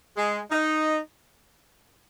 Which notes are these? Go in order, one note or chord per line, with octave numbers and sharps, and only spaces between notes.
G#3
D#4